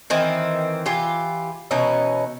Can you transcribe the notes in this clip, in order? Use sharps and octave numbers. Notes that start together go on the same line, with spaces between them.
D#3 E3 C4
E3 F4 G4
B2 E3 C#4 D#4